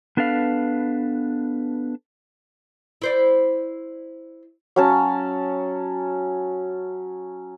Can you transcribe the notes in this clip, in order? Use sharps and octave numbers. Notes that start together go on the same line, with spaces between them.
B3 D4 A4 B4 F5
E4 C5 D5
F#3 C#4 A5